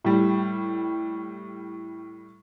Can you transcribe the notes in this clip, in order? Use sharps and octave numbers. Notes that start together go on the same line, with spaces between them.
A2 G3